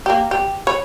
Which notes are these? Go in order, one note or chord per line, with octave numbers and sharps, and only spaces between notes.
A#3 G4
G4
C#5 B5